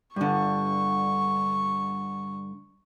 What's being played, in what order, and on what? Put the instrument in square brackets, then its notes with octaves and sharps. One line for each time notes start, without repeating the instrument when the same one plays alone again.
[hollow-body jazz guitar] G2 D3 [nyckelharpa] C#6